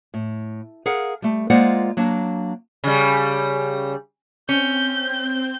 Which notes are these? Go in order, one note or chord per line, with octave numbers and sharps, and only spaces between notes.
A2
G#4 A#4 F5 F#5
G3 A3
G#3 A#3 F4 C5 D5 F#5
F#3 A#3 D4
C#3 G3
C4 C#4 G6